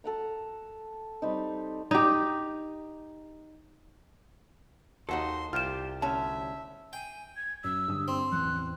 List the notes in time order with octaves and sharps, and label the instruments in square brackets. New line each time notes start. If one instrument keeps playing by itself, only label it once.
[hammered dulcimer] A4 F#5 A#5
G3 C4 D#4
[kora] D#4 G4
[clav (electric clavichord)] D#2 [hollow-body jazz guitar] D#4 F#4 A4 [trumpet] C6
[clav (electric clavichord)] C2 G5 [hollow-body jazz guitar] F4 [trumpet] G4 [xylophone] F6 E7
[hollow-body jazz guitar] D2 C#4 [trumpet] E5 [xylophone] A5
[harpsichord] G5 [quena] G#5
[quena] G#6
[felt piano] F#2 [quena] E6
[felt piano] G2 D3 D#6
[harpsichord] C4
[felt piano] A1 E2 [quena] F#6